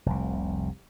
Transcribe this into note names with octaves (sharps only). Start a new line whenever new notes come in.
F1 C2